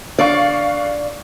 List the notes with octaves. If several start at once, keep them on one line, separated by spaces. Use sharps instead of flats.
D3 D5 F5 C#6